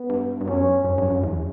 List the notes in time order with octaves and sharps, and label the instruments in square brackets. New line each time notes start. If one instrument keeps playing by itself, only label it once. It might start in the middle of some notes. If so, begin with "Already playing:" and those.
Already playing: [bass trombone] B3
[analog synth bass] G2
G2
[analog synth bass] F#2 [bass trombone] C#4
[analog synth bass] F#2 [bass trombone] C#4
[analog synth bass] G2
F#2
E2